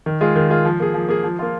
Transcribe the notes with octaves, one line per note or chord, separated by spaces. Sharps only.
D#3
G#3 F4 G#4
D#3
G#3 F4 G#4
F3
A#3 G#4
F3
A#3 G#4
F3
A#3 F4